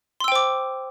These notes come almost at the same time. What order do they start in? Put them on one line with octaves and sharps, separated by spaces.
C6 E6 G5 C5 D6